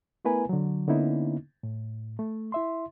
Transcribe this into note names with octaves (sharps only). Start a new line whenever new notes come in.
A3 B3 E4 A#4 B4 G#5
D3 F#3
D3 A#3 B3 C#4 D#4 E4
A2
A3
E4 E5 C6